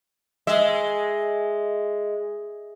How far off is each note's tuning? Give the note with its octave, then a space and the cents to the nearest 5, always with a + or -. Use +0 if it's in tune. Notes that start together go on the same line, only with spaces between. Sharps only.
G#3 +0 E5 +0